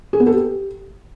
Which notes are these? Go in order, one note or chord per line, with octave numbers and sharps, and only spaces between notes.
G#4
B3
A4
G4